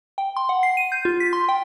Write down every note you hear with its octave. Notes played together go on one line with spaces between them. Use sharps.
G5
C6
F#5
C7
D#7
G6
F4
B6
C6
G5